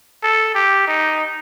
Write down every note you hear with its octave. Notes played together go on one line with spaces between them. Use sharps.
A4
G4
D#4